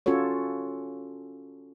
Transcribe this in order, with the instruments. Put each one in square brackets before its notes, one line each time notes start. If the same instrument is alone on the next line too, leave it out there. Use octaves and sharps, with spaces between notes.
[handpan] C#4 F4 F#4 A4 C#5